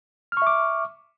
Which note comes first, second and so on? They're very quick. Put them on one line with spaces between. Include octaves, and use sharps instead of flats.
F6 C#6 E5 D6